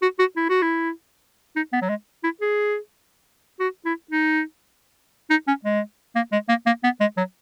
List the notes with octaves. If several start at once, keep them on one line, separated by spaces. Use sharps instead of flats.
F#4
F#4
E4
F#4
E4
D#4
B3
F#3
G#3
E4
G#4
F#4
E4
D#4
D#4
C#4
G#3
A#3
G#3
A#3
A#3
B3
G#3
F#3